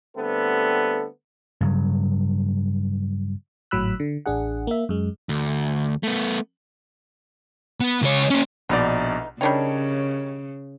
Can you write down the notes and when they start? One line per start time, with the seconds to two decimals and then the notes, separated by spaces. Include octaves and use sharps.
0.16 D3 G3 A3 B3 C4 A4
1.61 G2 C#3 F#3
3.71 G#1 A2 F#3 B5 E6 F#6
4.00 D3
4.26 A1 D4 G#4 F#5
4.67 A#3 E5
4.89 F#2 G#3
5.29 D2
6.03 A3 B3
7.81 B3
8.03 C#2 C#5
8.30 A#3 C#4
8.69 A#1 B2 D3 E3 D#4 D5
9.41 C#3 G3 D4 D#4 A#4 C#5 G5